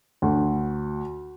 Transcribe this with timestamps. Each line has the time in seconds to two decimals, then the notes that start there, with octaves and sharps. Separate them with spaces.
0.22 D2